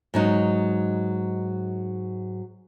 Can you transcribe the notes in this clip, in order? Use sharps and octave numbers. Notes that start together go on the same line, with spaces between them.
G#2 F#3 D#4